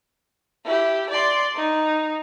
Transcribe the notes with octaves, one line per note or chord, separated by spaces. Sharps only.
E4 G4
D5 C6
D#4